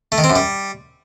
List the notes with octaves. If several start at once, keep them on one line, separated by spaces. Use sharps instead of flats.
A3
D#3
C4
F#2
G3